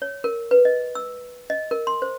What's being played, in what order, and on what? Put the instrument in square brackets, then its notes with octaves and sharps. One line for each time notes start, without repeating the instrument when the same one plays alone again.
[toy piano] C#5
A#4
B4
D#5
E6
D#5
A#4
C6
C5